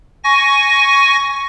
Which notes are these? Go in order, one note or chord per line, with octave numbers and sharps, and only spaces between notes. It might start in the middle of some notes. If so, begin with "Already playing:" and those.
G#5 C#6 A#6